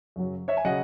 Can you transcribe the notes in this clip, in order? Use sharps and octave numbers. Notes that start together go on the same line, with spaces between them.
F#2 C#3 F#3
C#5 E5
G#5
C#3 F#3 D#5 F#5